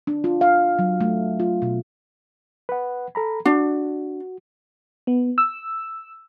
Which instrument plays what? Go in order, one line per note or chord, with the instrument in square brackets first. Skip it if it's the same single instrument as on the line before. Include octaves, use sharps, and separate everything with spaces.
[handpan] D4
F4
F5
F#3
A3
F4
B2
[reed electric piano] B4 F#5
A4 A#5 B5
[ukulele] D4 [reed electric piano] F#4
[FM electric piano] B3
E6